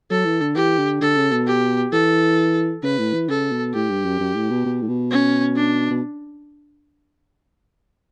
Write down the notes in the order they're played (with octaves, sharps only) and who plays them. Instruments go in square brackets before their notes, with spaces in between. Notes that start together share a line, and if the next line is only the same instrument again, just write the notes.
[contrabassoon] F#3 [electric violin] A4
[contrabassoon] E3
D3
[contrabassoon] E3 [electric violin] G4
[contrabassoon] D3
[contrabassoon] D3 [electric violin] A4
[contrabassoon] C#3
B2
[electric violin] G4
[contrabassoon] E3 [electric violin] A4
[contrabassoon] C#3 [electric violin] B4
[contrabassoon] A2
E3
[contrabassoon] C#3 [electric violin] A4
[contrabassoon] B2
[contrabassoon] A2 [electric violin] G4
[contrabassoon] G2
F#2
F#2
A2
B2
B2
A2
B2
[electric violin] C#4
D4
[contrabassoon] B2